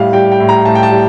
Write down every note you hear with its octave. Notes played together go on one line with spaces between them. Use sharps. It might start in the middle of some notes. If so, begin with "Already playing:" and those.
Already playing: A2 G3 F5
G3 G5
G5
A2
A#5
A2 A5
G5
A5
G3